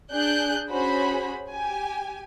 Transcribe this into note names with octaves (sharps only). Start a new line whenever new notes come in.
D4 G#4 F#6 G6
C#4 F#4 G#4 C5 B5
G4 G#5